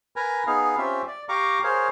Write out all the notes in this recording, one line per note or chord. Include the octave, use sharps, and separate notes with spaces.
A#4 B4 G#5 A#5
B3 D#4 G#4 F5
C4 C#4 F4 G4 E5
D5
G4 F5 A#5 C#6 D6
G#4 A#4 C5 C#5 F5